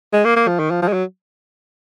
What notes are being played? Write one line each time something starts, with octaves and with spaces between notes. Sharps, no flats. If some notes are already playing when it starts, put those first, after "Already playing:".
G#3
A#3
A#3
F3
D#3
F3
F3
G#3
F#3